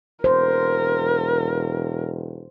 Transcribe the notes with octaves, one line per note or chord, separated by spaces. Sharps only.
E1 A#4 C5